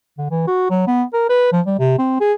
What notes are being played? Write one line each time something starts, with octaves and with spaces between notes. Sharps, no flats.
D3
E3
F#4
F#3
B3
A#4
B4
F3
G3
C3
C4
G#4